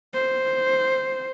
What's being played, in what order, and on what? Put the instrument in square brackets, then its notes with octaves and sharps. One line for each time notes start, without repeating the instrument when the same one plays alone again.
[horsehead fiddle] C5